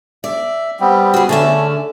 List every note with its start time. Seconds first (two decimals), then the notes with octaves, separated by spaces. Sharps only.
0.24 D5 E5
0.80 G3 B3 C4
1.14 F#4 G#4
1.29 D3 A3 C#4 D5 E5